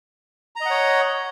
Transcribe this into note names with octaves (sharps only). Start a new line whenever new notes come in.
C#5 D#5 F#5 A#5